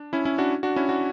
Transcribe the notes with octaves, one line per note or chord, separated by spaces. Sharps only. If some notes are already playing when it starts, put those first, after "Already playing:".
Already playing: D4
C#4 E4
C#4 E4
D4 F#4
D4 F#4
C#4 E4
D4 F#4